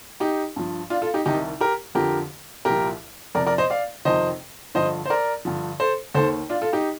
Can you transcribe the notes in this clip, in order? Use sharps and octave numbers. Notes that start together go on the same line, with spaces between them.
D#4 G4
G2 F3
D4 F4
F4 A4
D#4 G4
C2 C3 D#3 D#4 G4
G4 A#4
F2 D3 F3 G4 A#4
C2 A#2 F3 G4 A#4
F2 C3 F3 A#4 D5
A#4 D5
C5 D#5
D5 F5
F2 C3 D#3 C5 D#5
G2 D3 F3 C5 D#5
C5
A#4 D5
G2 D3 F3
A4 C5
D#2 D#3 A4 C5
D4 F4
F4 A4
D#4 G4